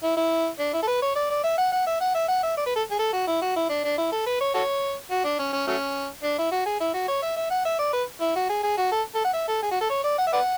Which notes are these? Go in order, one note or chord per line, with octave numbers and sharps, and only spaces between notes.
E4
E4
D4
E4
A4
B4
C#5
D5
D5
E5
F#5
F#5
E5
F#5
E5
F#5
E5
D5
B4
A4
G#4
A4
F#4
E4
F#4
E4
D4
D4
E4
A4
B4
C#5
F#4 A4 C#5
F#4
D4
C#4
C#4
F#3 A3 C#4
D4
E4
F#4
G#4
E4
F#4
C#5
E5
E5
F#5
E5
D5
B4
E4
F#4
G#4
G#4
F#4
A4
A4
F#5
E5
A4
G#4
F#4
A4
C#5
D5
F#5
E5
B4 D5 F#5